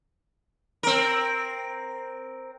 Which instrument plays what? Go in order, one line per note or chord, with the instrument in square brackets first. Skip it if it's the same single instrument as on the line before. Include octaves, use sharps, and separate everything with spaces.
[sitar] C4 A#4